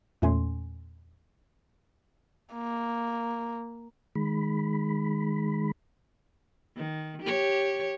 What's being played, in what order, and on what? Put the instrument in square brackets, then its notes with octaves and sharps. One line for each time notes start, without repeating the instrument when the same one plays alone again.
[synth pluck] E2 A#2 A3 C#4 G#5 C6
[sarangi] A#3
[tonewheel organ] D#3 G#3 B5
[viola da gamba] D#3
G4 C#5